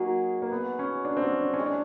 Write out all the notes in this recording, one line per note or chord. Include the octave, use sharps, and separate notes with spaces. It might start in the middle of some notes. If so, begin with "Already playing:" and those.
Already playing: F#3 A#3 D#4 G#4
A#3
B3
C#4
D4
C4
C#4
D4
C#4
G#3 C4 E4
D4